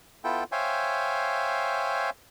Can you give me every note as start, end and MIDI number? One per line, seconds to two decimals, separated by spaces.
0.24 0.44 59
0.24 0.44 64
0.24 0.44 65
0.24 0.44 69
0.24 0.44 79
0.52 2.10 72
0.52 2.10 73
0.52 2.10 76
0.52 2.10 77
0.52 2.10 79
0.52 2.10 80